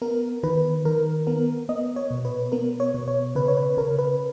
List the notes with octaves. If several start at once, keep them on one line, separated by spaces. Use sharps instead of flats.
B3 A#4
D#3 B4
D#3 A#4
B3 A#4
B3 D#5
C#5
B2
B4
B3 A#4
C#5
B2
C#5
C#3 B4
C#5
B4
C#3 A#4
B4